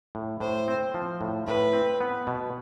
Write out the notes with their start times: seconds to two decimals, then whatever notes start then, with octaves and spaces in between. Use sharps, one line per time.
0.15 A2
0.40 A2 C5
0.68 C4
0.94 F3
1.21 A2
1.47 A2 B4
1.73 C4
2.00 B3
2.27 B2